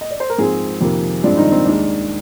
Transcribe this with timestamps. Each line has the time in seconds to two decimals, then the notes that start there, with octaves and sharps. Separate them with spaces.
0.01 D#5
0.11 D5
0.20 C5
0.30 A#4
0.38 G#2 F3 G#3 C4 G#4
0.81 F2 C3 D#3 A#3
1.23 G2 F3 G#3 C4 D4 D5
1.37 D#3 D#4
1.52 C4
1.65 D#2 D#3 G#3 D4